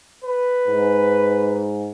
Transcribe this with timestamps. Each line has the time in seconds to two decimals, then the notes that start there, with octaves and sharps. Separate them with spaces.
0.24 B4
0.68 G#2